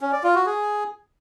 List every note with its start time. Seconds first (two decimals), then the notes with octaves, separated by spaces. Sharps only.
0.01 C#4
0.12 D5
0.23 F4
0.35 F#4
0.46 G#4